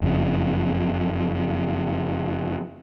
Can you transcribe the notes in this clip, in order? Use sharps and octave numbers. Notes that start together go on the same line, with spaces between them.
F#1 F2 G#2 C#3